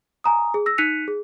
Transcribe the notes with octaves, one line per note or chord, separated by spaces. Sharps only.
G#5 A#5 D#6
G#4
E6 A#6
D#4 F#6 B6 C#7 D#7 F7
G#4